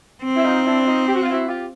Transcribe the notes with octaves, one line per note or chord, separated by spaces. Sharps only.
C4
E4
D#4 F4
D4 E4
D#4 F4
G4
F#4
F4
E4 F#4
F4 G4